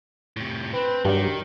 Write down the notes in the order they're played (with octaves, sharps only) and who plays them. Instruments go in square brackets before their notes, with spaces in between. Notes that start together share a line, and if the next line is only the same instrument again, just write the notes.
[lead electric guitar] A2 C3
[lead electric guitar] C4 [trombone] B4
[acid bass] G2 [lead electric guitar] D#3 [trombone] F#3 [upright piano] G4